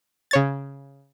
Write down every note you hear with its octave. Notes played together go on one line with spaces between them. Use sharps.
C#3 C#5 A6